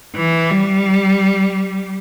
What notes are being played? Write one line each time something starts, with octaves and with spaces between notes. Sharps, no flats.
E3
G3